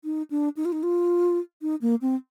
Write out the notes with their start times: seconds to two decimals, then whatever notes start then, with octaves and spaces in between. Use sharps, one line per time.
0.04 D#4
0.30 D4
0.57 D#4
0.65 F4
0.72 D#4
0.83 F4
1.62 D#4
1.82 A#3
2.01 C4